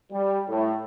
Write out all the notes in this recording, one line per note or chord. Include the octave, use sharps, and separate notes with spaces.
G3
A2